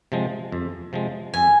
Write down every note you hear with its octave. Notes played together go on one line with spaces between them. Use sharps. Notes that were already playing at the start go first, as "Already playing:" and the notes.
C3 F3 G#3
F2
C3 F3 G#3
F2 G#5